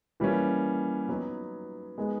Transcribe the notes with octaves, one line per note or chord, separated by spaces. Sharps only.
E3 G3 A#3 C#4
F#3 B3 D#4
G#3 B3 D#4